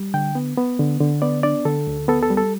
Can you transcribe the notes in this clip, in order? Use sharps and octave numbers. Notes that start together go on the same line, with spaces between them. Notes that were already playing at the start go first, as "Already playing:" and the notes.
Already playing: G3
D3 G5
B3
B3
D3
D3
B3 D5
D4 D5
D3 A4
D2
B3 A4
A4
G3
A4